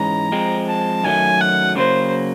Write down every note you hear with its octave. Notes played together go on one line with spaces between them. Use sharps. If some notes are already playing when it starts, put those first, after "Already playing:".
Already playing: G#2 E3 G#3 C#4 A#5
F3 G#3 C4
A5
F#2 D#3 F#3 A3 G#5
F#5
C#3 F#3 A#3 C5